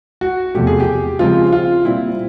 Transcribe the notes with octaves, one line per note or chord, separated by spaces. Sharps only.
F#4
E2 C3 F3 A3 G4
G#4
G4
C#3 F3 G#3 C4 F4
F4
A#2 G3 C4 E4